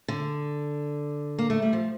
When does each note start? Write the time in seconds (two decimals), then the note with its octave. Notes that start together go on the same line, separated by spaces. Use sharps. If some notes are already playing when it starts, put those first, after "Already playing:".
0.08 D3
1.39 A#3
1.50 A3
1.62 G3
1.73 F3